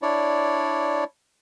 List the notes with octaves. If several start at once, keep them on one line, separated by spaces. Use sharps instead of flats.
D4 E4 C#5 D5